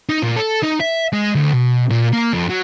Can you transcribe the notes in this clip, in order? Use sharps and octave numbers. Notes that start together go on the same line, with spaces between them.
D#4
A#2
A4
D#4
E5
G#3
D2
B2
A#2
A#3
F2
F#3